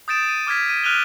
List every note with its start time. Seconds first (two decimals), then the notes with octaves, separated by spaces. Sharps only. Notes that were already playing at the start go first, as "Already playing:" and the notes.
0.08 D#6 G6 A6 D7 E7
0.29 D#7
0.47 D6 F6 G#6 B6
0.69 D#7
0.84 F6 F#6 D#7 F7 G7